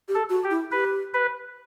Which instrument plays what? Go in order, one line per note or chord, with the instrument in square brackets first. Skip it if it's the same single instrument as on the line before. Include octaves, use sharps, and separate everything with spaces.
[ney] G4
[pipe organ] A4
[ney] F#4
[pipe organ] G4
[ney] E4
[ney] G4 [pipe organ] B4
[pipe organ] B4